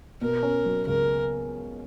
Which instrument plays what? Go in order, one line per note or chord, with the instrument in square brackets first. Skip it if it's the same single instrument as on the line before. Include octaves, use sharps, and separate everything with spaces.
[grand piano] B2 [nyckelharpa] A#4
[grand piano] C#4
F#3
[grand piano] C#2 [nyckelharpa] A#4